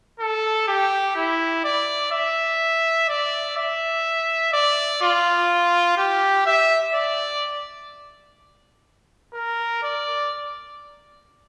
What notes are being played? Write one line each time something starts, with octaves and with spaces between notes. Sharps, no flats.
A4
G4
E4
D5
E5
D5
E5
D5
F4
G4
E5
D5
A#4
D5